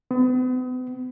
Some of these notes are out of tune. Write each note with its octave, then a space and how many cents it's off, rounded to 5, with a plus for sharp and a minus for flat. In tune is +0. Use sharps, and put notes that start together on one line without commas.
B3 +40